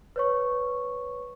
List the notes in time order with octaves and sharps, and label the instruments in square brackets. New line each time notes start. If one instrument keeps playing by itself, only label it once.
[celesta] B4 C#5 C#6